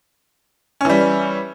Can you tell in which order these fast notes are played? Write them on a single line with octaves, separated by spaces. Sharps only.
C#4 E3 G3